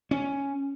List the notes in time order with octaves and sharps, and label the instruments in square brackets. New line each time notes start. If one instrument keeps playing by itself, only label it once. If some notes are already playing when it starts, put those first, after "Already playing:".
[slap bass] C#4